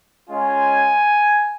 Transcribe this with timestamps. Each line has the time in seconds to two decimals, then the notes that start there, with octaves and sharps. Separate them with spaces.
0.30 G#3 C#4 F4 G#5